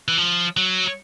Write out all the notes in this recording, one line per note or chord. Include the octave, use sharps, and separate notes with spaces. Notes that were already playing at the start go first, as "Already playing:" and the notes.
E3
F3
F#3